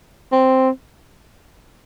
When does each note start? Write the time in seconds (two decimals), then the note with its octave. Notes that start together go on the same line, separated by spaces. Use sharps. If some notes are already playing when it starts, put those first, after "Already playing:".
0.32 C4